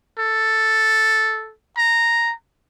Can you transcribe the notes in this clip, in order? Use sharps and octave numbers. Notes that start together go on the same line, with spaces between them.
A4
A#5